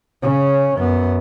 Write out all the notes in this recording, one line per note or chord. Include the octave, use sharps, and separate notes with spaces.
C#3 C#4
F#2 B3